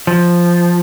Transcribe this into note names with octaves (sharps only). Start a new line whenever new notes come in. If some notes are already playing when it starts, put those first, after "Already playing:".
F3